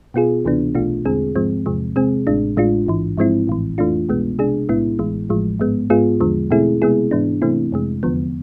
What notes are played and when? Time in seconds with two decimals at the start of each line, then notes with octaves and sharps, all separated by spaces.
0.14 B2 B3 F4 G#4
0.45 D2 C3 E3 B3 D4
0.75 B1 B2 A3 D4 F4
1.05 E2 D3 G#3 C4 G#4
1.36 G#2 F3 G#3 C4
1.66 E2 C3 F3 G#3
1.96 C3 G#3 C4 G#4
2.27 A1 A2 G#3 D4
2.57 A1 A2 G#3 D4 F4
2.87 A1 G#2 E3
3.17 G#2 F3 G#3 C4 E4
3.47 A1 A2 E3
3.78 F2 E3 A3 D4 F4
4.09 C2 B2 G#3 B3
4.39 C3 G#3 D4 G#4
4.69 B1 A2 G#3 B3 E4
4.99 A1 A2 E3 G#3
5.30 A1 A2 F3 G#3
5.60 G#2 G#3 B3
5.90 G#2 G#3 B3 F4 G#4
6.20 E2 D3 F3 G#3
6.51 B2 A3 C4 E4 G#4
6.82 C3 G#3 B3 E4 G#4
7.11 G#2 E3 B3 D4
7.42 C3 E3 A3 C4 E4
7.72 F2 C3 G#3
8.03 E2 D3 F3 B3